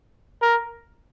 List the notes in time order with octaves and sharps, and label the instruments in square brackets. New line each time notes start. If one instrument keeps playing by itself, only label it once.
[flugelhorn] A#4